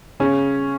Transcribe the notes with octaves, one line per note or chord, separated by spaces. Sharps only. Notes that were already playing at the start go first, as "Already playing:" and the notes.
C#3 C#4